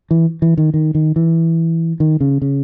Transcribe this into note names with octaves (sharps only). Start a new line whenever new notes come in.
E3
E3
D#3
D#3
D#3
E3
D#3
C#3
C#3